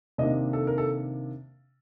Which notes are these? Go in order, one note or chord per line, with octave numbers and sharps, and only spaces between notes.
C3 D#3 A#3 D4 D#5
A4
A#4
A4